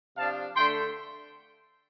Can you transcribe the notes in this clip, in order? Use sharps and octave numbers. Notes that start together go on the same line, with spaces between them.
C3 F3 D4 F5 A5
D3 A3 D4 G5 C6